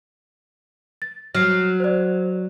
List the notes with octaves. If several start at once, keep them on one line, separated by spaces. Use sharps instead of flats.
A6
F#3 F6 C7
C5 D5